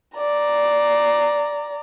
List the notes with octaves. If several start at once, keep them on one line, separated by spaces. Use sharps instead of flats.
D5 A#5